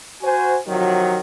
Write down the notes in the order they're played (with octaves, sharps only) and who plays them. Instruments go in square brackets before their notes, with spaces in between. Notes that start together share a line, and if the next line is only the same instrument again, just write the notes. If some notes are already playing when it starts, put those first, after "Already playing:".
[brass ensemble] F#4 C5 G#5
C3 D#3 F3 F#3